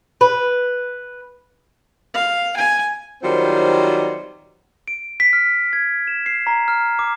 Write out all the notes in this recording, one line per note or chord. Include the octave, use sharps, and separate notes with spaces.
B4
F5
G#5
D#3 F#3 G3 C4 F4 C5
D7
B6
F6
G#6
E7
C7
A#5
F6
D6